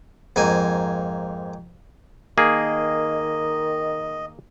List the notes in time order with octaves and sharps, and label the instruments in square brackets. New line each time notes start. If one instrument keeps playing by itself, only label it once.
[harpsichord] F2 G#2 A#3 G#5
[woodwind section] D#3 [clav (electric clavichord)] A#3 G#4 [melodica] D#5